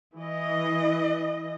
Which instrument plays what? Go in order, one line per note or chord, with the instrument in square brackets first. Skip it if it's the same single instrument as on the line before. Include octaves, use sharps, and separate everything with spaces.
[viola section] E3 D#5